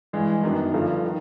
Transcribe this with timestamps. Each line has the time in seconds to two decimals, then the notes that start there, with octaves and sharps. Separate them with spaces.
0.13 G2 E3 G#3
0.43 F#2 D#3 F#3 B3 D4
0.74 G2 D3 F3
1.05 D#3